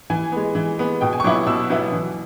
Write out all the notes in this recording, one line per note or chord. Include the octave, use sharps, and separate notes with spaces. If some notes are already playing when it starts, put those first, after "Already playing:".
E3 G#5
G#3 B3
E3
G#3 B3
B2 G5
G#5
C#6
F#3 B3 E4 D6
B2 E6
F#3 B3 E4
E3